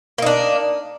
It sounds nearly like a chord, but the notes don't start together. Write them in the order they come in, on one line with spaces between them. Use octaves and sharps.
A#3 D#4 D4